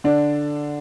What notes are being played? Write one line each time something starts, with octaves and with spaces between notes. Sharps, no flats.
D3 D4